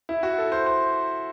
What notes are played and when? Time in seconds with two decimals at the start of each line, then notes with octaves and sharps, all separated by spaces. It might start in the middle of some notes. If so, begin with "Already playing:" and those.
0.09 E4
0.23 F#4
0.38 A4
0.52 C5
0.66 C5